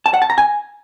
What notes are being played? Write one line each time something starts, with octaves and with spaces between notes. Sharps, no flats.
A5
F#5
A5
A#5
G#5